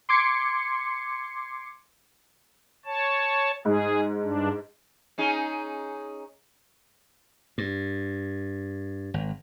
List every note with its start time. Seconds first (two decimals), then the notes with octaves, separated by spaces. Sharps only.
0.09 C6 D6 G#6 C7 C#7
2.86 C#5 A5
3.65 G#2 G#4
4.22 G2 D4
5.18 C#4 D#4 G#4
7.58 G2
9.14 G#1